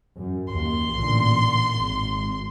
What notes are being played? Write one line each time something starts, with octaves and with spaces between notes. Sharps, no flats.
F#2
D#2 C6
A1 A#2 D3
G#1